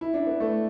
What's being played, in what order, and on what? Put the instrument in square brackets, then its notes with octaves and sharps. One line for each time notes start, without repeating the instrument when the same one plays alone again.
[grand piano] E4
D4
B3
A3